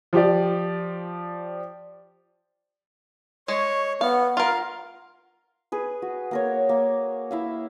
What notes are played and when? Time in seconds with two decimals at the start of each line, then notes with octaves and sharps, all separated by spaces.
0.13 F3 G4 D5
3.48 G#3 C#5 C#6
4.01 B3 F5 F#5
4.37 F4 A#4 F5
5.72 G#4 B4
6.02 F#4
6.31 A#3 A#4 C#5
6.69 A#3
7.31 E4 E5 F5